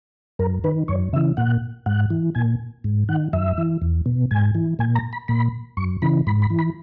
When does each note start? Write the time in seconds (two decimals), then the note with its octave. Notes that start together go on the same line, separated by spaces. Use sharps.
0.39 F#2 A#4
0.64 D#3 B4
0.88 F#2 C#5
1.13 C#3 E5
1.16 E3
1.37 A#2 F#5
1.86 G#2 F#5
2.10 E3
2.35 A#2 G#5
2.84 G#2
3.09 D#3 F#5
3.33 F#2 E5
3.58 E3
3.82 E2
4.06 B2
4.31 G#2 G#5
4.55 E3
4.79 A#2 G#5
4.95 A#5
5.13 B5
5.28 A#2 B5
5.77 F#2 C#6
6.02 C#3 E3 B5
6.27 G#2 B5
6.42 B5
6.50 E3
6.59 B5